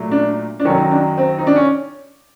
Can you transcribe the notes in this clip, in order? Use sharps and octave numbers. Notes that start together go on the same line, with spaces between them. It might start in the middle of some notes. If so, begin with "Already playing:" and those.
Already playing: A#2 F#3 A3
D4
D4
F#2 D#3 F#3 C#4
D#4
D4
C4
D#4
D4
C#4